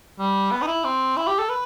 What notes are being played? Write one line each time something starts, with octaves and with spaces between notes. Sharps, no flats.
G3
B3
D#4
E4
C4
E4
G4
A4
B4